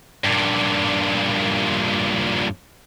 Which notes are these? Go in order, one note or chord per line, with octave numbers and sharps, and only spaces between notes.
G2 A#2